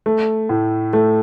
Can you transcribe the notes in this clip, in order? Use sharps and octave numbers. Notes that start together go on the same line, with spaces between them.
A3
A2
A3